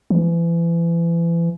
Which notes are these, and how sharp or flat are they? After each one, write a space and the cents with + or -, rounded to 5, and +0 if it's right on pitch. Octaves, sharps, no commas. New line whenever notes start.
E3 +35